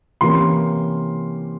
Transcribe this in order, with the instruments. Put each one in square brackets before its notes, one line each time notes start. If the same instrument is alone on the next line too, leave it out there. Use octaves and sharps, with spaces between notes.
[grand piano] C3 E3 A#3 C#4 C6